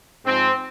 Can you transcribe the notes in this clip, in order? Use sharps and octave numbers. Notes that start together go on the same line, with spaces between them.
G#2 F3 C4